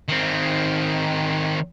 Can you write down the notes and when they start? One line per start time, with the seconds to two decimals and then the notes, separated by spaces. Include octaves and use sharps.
0.08 D#3 C4